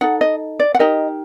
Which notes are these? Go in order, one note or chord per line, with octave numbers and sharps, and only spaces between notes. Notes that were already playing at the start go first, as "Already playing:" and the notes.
D#4 A4 F#5
D#5
D5
F#5
D#4 G4 A#4 D#5